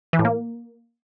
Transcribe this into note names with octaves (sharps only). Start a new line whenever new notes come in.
E3
A2
A#3